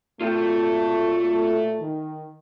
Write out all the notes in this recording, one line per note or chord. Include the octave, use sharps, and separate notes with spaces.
A#2 F#3 A3 F4 A4 G5
D#3